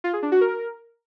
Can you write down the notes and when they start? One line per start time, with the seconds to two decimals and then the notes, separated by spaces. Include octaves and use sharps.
0.04 F4
0.13 G#4
0.23 D4
0.32 F#4
0.41 A#4